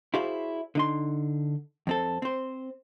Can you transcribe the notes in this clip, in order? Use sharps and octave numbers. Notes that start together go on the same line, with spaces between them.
E4 F#4 G#4 C5 D5 F5
D3 D#4 C6
F2 C4 A4
C4 C5